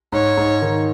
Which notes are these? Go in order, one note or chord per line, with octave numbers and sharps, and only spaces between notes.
G#2 C#5
G#2
D#3